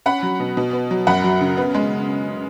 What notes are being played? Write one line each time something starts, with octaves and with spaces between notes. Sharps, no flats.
C#4 F#5 B5
F#3
B2
B2
B3
F#3
F#2 F#5 B5
F#3
C#3
B3
G#3